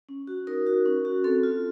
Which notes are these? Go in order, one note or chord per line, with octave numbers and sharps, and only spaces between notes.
C#4
F#4
D#4 A#4
F#4
C#4
F#4
C4 A4
F4